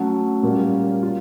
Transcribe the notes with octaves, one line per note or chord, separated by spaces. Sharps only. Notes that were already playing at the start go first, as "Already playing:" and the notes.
Already playing: F#3 A3 C#4 F#4
A#2 G3 A#3 C#4 F4
F4